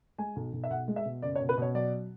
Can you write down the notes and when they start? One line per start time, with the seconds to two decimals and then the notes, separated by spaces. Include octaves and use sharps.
0.18 G#3 G#5
0.36 B1
0.53 B1
0.64 E5
0.70 B1 F#5
0.88 G#3
0.96 E5
1.05 B2
1.22 F#1 D5
1.35 C#5
1.40 B2
1.49 B4
1.58 B2 C#5
1.75 F#3 D5